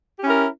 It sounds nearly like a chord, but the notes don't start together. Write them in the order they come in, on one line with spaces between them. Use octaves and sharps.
G4 C#4 E4 A#4